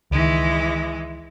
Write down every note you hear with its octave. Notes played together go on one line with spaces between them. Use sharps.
C#2 D#3 E3 G#3